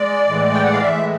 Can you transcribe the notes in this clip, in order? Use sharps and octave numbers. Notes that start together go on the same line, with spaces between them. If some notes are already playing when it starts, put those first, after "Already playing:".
Already playing: G#3 D5
A2 E3 G#3
G5
F#5
F5
A2 E3 G#3 E5